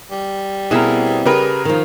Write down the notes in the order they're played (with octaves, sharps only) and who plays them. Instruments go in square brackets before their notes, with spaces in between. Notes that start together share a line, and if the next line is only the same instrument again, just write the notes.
[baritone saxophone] G3
[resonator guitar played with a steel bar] B2 A#4 [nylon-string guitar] B3 C4 E4 [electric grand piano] G#4
[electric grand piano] C#3 G#4 A#4 [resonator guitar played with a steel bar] G4 B4
[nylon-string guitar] D#3 F3